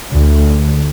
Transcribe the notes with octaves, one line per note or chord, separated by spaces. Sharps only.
D2